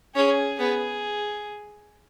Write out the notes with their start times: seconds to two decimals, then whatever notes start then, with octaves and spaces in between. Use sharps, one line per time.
0.15 C#4 G#4
0.59 B3 G#4